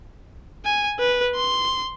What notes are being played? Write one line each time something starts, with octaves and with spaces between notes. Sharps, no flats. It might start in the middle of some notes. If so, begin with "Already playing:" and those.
G#5
B4
C6